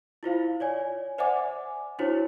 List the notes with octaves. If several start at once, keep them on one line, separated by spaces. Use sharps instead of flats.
E4 F4 C5 F5
C#5 D5 G#5
C5 D5 E5 F#5 G#5 D6
D4 E4 F#4 C5 C#5